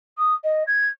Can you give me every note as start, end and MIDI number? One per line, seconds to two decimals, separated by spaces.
0.18 0.34 87
0.44 0.63 75
0.67 0.88 92